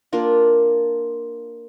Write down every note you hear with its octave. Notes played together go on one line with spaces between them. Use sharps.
A#3 D4 F4